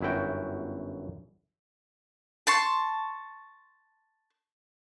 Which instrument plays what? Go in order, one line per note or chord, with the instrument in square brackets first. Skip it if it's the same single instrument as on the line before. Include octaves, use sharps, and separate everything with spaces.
[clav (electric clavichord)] G1 F#2 E4 F#4 G5
[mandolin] A5 C6 C#6